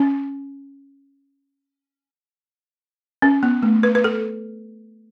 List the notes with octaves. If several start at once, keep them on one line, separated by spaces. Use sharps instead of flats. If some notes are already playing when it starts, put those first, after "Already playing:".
Already playing: C#4
C#4
B3
A3
B4
B4
A4